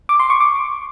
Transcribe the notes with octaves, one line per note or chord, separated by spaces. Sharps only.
D6
C6
C#6
D6